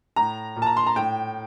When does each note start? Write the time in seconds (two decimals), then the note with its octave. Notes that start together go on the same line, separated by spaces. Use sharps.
0.16 A2 A#5
0.56 A#2
0.62 A5
0.66 A#5
0.77 C6
0.87 A#5
0.96 A2 G5